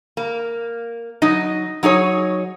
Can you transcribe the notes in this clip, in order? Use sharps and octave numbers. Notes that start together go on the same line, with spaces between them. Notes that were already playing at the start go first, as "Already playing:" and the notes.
A#3
F#3 D#4 D#5
F#3 D#4 G#4 C#5